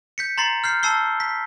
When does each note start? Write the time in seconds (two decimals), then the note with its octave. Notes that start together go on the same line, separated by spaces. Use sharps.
0.18 G6 B6 C#7
0.38 A#5 C6 A6 C7
0.64 F6 G6 C7
0.83 A5 E6 C7 G7
1.20 B6